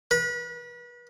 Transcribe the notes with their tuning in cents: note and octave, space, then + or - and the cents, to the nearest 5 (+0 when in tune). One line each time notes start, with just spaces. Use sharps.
B4 -35